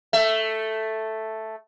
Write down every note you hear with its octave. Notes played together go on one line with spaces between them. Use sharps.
A3 E5